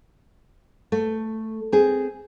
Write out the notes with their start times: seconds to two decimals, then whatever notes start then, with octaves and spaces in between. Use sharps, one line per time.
0.92 A3
1.72 C4 G#4